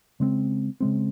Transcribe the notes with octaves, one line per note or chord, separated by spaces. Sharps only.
C#3 G#3 C4
C#3 G#3 C4